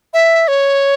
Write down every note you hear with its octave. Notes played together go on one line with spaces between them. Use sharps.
E5
C#5